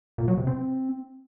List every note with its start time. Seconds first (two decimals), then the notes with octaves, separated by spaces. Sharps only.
0.18 A#2
0.28 F#3
0.37 C3
0.47 C4